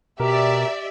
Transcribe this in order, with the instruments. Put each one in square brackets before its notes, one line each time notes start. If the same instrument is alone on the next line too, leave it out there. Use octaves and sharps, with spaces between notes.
[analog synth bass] B2 [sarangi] G4 [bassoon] A#4 [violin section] D5 E5